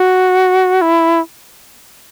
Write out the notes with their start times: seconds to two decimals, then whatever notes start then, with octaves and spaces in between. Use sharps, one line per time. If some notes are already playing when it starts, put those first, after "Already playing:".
Already playing: F#4
0.82 E4